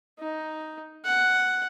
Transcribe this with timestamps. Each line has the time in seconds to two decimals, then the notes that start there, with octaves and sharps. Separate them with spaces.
0.19 D#4
1.05 F#5